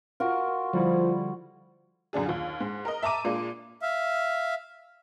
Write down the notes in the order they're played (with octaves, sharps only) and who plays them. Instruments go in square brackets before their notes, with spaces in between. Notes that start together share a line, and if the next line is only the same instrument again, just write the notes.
[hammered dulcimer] F4 F#4 [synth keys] A#4
[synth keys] D3 G3 E4 [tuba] F3
[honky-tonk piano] F#2 D3 D4 G#4
D#2 F4
G#2
A#4 D#5
E5 A5 A#5 D6 D#7
A#2 G#3 A#3 D4
[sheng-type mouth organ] E5 F5